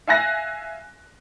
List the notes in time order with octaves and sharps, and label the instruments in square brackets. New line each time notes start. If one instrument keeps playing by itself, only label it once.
[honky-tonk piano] E5 F5 G#5 F#6 A#6